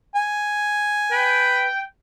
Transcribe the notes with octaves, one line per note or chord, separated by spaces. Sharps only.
G#5
B4 G5